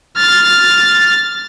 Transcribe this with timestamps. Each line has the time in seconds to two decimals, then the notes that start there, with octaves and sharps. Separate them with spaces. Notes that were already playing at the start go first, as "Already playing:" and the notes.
0.16 F6 A6